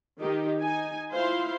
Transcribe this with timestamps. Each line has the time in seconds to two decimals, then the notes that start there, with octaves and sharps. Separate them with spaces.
0.20 D#3 D#4 G4
0.60 D#4 G#5
1.12 E4 F4 C5 F5 C6